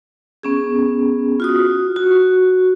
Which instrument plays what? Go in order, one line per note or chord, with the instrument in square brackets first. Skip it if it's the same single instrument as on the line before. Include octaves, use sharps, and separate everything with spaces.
[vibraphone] B3 C#4 G#4
F4 F#4 D#6
F#4